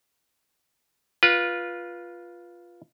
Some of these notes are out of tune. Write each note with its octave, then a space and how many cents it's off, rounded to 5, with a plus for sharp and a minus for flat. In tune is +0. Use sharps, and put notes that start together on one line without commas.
F4 +0 B4 -20